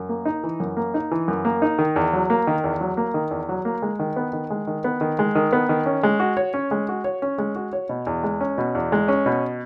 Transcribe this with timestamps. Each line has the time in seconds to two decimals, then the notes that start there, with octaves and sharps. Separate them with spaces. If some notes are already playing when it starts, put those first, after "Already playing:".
Already playing: F#2
0.09 A#3
0.25 D#4
0.44 E3
0.60 F#2
0.77 A#3
0.94 D#4
1.11 E3
1.28 F#2
1.45 A#3
1.62 D#4
1.79 D#3
1.96 E2
2.13 F#3
2.30 A#3
2.47 D#3
2.64 E2
2.81 F#3
2.97 A#3
3.14 D#3
3.31 E2
3.49 F#3
3.65 A#3
3.82 G#3
3.99 D#3
4.16 B3
4.33 D#3
4.50 G#3
4.67 D#3
4.84 B3
5.01 D#3
5.19 G#3
5.35 D#3
5.53 B3
5.69 D#3
5.86 C#4
6.03 G#3
6.20 F#4
6.37 C#5
6.54 C#4
6.71 G#3
6.89 F#4
7.04 C#5
7.22 C#4
7.38 G#3
7.56 F#4
7.73 C#5
7.89 B2
8.07 E2
8.23 G#3
8.41 C#4
8.58 B2
8.75 E2
8.92 G#3
9.08 C#4
9.26 B2